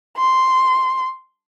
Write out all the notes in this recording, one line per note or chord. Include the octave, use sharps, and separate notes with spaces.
C6